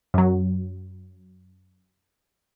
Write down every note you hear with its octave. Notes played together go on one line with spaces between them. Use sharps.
F#2 F#3